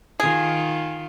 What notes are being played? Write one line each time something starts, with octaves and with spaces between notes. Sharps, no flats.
D#3 F4 G#4